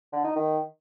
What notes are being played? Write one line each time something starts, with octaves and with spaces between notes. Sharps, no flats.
D3
D#4
D#3